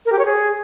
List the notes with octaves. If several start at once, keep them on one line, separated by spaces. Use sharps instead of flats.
A#4
G4
C#5
G#4